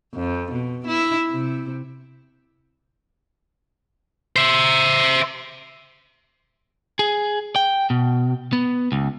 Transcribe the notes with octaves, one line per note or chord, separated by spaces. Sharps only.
F2
B2
E4
C3
C5 E5
G#4
G5
B2
B3
C#2